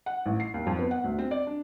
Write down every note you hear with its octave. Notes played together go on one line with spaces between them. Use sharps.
F#5
A1
C7
D#2
F2
B3
F#5
D2
C4
D5
D4